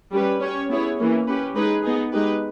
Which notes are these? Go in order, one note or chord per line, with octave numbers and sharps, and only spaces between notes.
G3 C#4 G4 B4
C#4 G4 C#5
B3 E4 G#4 C#5
E3 A#3 C#4
C#4 G4 B4
G#3 D#4 G#4 B4
B3 D#4 G#4
G#3 D#4 G4 B4